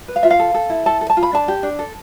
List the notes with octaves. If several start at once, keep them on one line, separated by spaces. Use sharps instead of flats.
B4
F5
F4 E5
F5
A4
A4
E4
A4 A5
A4
A5
F4
B5
D4 A5
G4
D4
A4